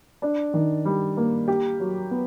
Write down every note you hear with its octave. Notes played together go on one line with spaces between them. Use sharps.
D4
D#3
G3
A#3
G4
F#3
B3